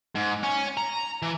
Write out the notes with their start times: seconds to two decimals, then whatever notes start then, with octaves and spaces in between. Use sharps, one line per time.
0.15 G#2
0.43 C#4
0.77 A#5
1.22 E3